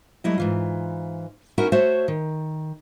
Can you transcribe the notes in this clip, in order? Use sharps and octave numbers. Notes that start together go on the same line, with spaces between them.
F#3 G3 A3 E4 D#5
G#2 E3 F4
C#4 D#4 E4 F#4 A#4 E5
A3 F#4 C5 C#5 E5
D#3